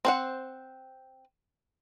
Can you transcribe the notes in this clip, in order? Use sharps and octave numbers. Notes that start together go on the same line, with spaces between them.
C4 C5 F#5